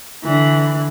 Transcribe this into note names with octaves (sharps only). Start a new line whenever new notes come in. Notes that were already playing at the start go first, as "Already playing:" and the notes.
D3 E3